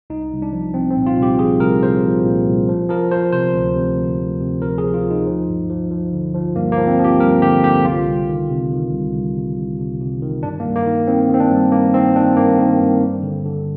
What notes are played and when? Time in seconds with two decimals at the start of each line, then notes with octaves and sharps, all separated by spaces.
0.10 C2 D#4
0.32 C2
0.42 D4
0.52 F3
0.74 C2 C4
0.91 C4
0.96 A#2
1.06 F4
1.17 C2
1.22 G4
1.39 F3 G#4
1.60 C2 A#4
1.82 C2 C5
2.04 F3
2.25 A#2
2.47 C2
2.68 F3
2.89 F3 A#4
3.11 F3 C5
3.32 C3 C5
3.55 D2
3.76 C3
3.97 D2
4.19 D2
4.41 C3
4.62 F3 A#4
4.78 G#4
4.83 F3
4.94 F4
5.05 D2
5.11 D#4
5.26 F3
5.48 G2
5.70 F3
5.91 F3
6.13 D3
6.34 F3
6.56 G2 A#3
6.72 A#3
6.78 F3
6.87 C4
6.99 F3
7.04 G4
7.20 G2 A#4
7.42 D3 G4
7.64 D3 G4
7.85 C2 F4
8.06 C2
8.28 D#3
8.50 C3
8.71 D#3
8.93 C2
9.14 C2
9.36 C3
9.57 C2
9.79 C3
10.00 C3
10.22 D#3
10.43 G2 D4
10.60 A#3
10.65 G2
10.75 A#3
10.86 D#3
11.07 D#3 C4
11.29 D#3 C4
11.40 D4
11.50 G2
11.72 G2 A#3
11.94 D#3 C4
12.15 D#3 D4
12.37 G2 A#3
12.59 D#3
12.80 G2
13.02 G2
13.23 D3
13.45 D3